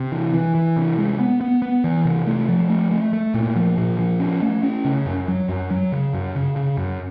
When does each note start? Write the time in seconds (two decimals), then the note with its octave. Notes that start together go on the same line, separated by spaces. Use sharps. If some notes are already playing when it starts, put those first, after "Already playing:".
Already playing: C3
0.12 E3
0.34 E3
0.55 E3
0.77 C3
0.98 G#3
1.19 B3
1.41 B3
1.62 B3
1.84 E3
2.05 C3
2.27 A3
2.49 F3
2.70 A3
2.91 A3
3.13 A3
3.34 A#2
3.56 F3
3.78 A#2
3.99 F3
4.20 C#4
4.42 A3
4.63 C#4
4.85 C#3
5.06 F#2
5.28 F#3
5.49 F#2
5.70 F#3
5.92 C#3
6.14 F#2
6.35 C#3
6.56 C#3
6.77 F#2